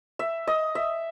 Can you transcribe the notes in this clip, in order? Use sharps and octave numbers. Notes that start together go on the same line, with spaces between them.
E5
D#5
E5